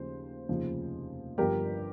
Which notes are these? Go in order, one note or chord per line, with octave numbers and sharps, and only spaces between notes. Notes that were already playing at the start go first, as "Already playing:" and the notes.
Already playing: D#2 C#3 F3 C5
F1 D#2 C#3 F3
G1 G2 F3 G4 A#4